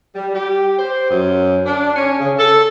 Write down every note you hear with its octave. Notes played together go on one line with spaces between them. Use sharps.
G3
G4
C5
F#2
D4
C#4
C#3
A4